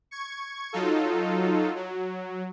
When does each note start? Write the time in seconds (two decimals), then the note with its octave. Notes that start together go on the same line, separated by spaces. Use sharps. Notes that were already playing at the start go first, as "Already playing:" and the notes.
0.11 C#6 G#6
0.73 F#3 D#4 F4 A4
1.75 F#3